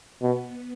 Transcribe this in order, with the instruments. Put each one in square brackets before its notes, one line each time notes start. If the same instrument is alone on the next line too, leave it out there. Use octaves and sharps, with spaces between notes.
[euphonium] B2 [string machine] B3